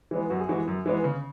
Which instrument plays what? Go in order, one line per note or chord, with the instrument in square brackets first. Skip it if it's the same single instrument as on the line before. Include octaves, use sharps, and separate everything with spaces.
[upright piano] E3 G#3 B3
F#2 F#4
G#4
E3 G#3 B3 F#4
F#2
E3 G#3 B3
C#3